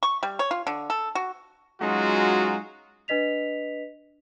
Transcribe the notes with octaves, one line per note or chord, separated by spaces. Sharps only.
C#6
G3
C#5
F4
D3
A4
F#4
F#3 G#3 C#4 D#4 F4 F#4
D4 B4 D#5 B6 F7